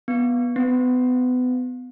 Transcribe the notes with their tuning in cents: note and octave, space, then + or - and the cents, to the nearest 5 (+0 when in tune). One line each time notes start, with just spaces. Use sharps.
B3 -15
B3 +30